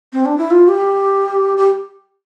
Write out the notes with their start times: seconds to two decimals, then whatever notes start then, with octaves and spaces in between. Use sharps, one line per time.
0.13 C4
0.25 D4
0.38 E4
0.51 F4
0.68 G4
1.57 G4